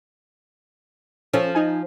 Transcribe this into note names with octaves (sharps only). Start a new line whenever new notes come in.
F3 C#4 A4
D#4 G#5